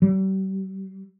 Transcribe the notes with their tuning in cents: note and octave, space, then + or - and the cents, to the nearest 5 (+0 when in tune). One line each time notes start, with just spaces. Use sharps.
G3 -40